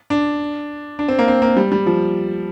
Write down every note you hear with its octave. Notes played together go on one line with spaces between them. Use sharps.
D4
D4
C4
A#3
C4
A#3
G3
G3
F3